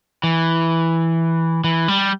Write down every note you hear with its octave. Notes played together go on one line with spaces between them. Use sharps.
E3
E3
G3